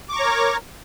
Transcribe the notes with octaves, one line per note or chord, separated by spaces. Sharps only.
A#4 C#5 A#5 C#6 D6